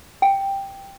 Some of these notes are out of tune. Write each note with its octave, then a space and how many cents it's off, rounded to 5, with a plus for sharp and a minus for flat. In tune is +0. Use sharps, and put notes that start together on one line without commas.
G5 +0